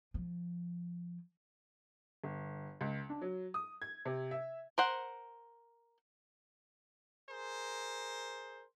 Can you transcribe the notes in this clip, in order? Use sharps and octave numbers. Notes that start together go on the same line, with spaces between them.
F3
G1
C#2
D4
F#3
D#6
G#6
C3
E5
A#4 C5 F#5
G#4 A#4 C5